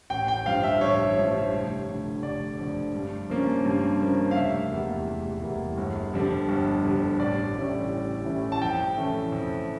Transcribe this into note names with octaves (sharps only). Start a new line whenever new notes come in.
A1 G5
G5
G2 F3 F5
E5
A1 C#5
G2 F3
F1
F2 D3
F1 D5
F2 D3
G2
F3 A#3 C#4
G2
F3 A#3 C#4
F5
F1 E5
E2 E3 G3 A#3
F1
E2 E3 G3 A#3
G1
F2 D3 G3 D4
G1
F2 D3 G3 D4
A1 D5
A2 E3 G3 C#4
A1
A2 E3 G3 C#4
A5
F2 G5
E3 A3 C#4
F2